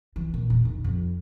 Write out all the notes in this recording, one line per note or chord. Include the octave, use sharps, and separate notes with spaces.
E3
A#2
E1
D#3
F2